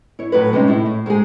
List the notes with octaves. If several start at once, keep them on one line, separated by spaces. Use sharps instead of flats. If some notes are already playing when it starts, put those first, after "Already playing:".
E4 C#5
A2 F#3 B4
G2 C3 G#3 C#4 D#4
A2 E4
A2
G#2 G#3 G4 G#4